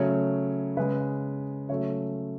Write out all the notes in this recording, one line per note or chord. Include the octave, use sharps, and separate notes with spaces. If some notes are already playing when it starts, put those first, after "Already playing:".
Already playing: C#3 F#3 A3 C#5
C#3 G#3 B4
C#3 F#3 A3 C#5